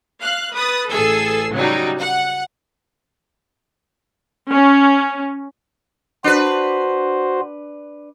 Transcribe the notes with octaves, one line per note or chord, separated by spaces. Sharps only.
F5 F#6
B4 D#6 A6
A1 G#4 A4 E6 C7
C#3 F#3 G3 D#4
F#5
C#4
D4 F#4 B4 C5